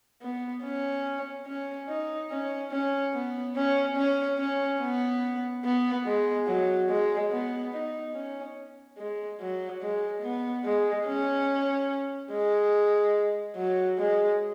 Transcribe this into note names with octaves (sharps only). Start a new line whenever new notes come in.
B3
C#4
C#4
D#4
C#4
C#4
B3
C#4
C#4
C#4
B3
B3
G#3
F#3
G#3
B3
D#4
C#4
G#3
F#3
G#3
B3
G#3
C#4
G#3
F#3
G#3